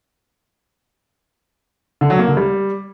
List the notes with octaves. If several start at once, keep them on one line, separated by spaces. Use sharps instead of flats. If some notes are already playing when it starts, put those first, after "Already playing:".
D3
F#3
A#3
D3
G3